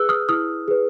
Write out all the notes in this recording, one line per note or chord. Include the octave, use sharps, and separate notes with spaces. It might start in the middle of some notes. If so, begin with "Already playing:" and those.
Already playing: G#4 B4 E6 F#6
D#6 F6
E4 D#6 F6
G#4 B4